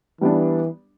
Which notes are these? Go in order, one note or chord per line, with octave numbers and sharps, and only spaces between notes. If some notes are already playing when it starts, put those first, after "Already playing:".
E3 G3 B3 D4